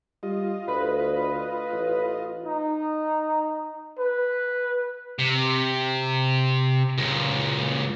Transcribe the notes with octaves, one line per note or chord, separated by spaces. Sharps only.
G3 F4 D#5
D2 B4
A1
D#4
B4
C3
C#2 A#2